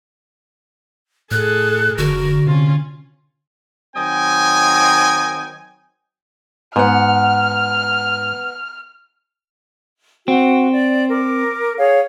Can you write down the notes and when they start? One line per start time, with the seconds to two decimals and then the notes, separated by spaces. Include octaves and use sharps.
1.31 A2 G#4 A4 F#6
1.98 F1 D3 F#4 A#4
2.47 C3 C#4 F4
3.96 D#3 F#3 C4 D#5 G5 G#5
6.76 G#2 B3 F#5 F6
10.28 C4 F#4
10.72 D5
11.09 A#4 D6
11.77 G#4 C#5 F5